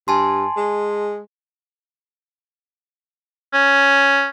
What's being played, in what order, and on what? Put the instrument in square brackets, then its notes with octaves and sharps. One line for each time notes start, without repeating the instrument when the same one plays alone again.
[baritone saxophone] G2 [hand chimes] G#5 A5 C6
[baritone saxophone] G#3
[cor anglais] C#4